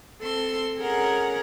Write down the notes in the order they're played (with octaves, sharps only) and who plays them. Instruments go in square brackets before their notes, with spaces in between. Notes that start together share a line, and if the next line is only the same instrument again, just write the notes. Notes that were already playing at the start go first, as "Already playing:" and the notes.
[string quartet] C4 A4 C6 E6
C#4 G#4 A#4 F#5 A#5